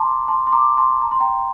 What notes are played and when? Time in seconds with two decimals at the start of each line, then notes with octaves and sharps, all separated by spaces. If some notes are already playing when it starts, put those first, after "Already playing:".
Already playing: A5 A#5 C6 D6
0.28 A5 C6
0.47 C6
0.53 A#5 D6
0.77 A5 C6
1.02 A#5
1.11 C6
1.20 G5 A#5